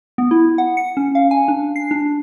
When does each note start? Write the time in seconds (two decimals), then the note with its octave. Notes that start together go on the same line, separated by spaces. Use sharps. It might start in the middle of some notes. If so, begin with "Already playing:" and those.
0.18 B3
0.31 E4
0.58 F#5
0.77 C#7
0.97 C#4
1.15 F5
1.31 G#5
1.48 D4
1.76 C7
1.91 D4